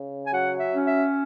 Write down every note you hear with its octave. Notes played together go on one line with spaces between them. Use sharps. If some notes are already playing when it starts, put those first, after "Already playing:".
Already playing: C#3
G#5
F#3 F#5
E5
C#4
E5